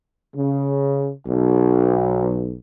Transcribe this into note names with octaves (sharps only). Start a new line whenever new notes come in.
C#3
B1